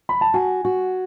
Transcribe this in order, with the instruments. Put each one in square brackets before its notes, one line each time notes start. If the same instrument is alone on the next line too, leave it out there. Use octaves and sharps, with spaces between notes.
[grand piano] B5
A5
[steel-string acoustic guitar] F#4 [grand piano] G#5
[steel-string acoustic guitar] F#4